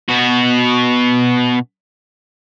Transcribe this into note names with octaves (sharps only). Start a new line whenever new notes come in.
B2 F#4